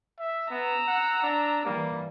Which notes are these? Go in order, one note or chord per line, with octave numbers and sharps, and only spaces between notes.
E5
B3 A#5 E6
F#5
D4
E3 G3 A#3